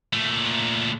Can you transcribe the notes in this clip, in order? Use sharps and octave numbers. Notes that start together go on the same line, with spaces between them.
A#2 A3